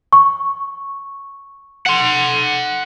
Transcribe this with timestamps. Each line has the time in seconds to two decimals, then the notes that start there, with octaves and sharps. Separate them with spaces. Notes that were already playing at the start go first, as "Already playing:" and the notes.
0.13 C#6
1.86 F#5 C6